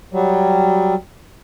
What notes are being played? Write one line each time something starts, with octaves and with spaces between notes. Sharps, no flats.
F#3 G3